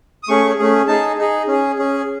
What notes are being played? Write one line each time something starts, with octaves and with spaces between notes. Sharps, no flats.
D#6
A3 C#4 G#4 C#6
A3 C#4 G#4
D#4 G#4 A5
D#4 G#4
C#4 G#4
C#4 G#4